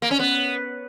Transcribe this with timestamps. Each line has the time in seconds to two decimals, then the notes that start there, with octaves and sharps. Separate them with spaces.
0.02 A#3
0.11 C#4
0.19 B3